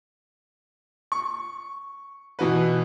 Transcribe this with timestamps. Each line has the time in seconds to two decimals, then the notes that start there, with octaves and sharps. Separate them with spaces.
1.12 C#6
2.39 B2 E3 F#4 B4